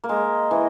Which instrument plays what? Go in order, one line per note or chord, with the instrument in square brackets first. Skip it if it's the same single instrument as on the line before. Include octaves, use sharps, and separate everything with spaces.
[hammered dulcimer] A#3
[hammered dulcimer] G#3 [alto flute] D#5
[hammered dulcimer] E3